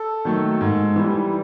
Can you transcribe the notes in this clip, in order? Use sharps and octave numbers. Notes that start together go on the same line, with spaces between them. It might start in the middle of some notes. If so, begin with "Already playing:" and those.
Already playing: A4
D#3 F#3 A3
G#2
E3 G3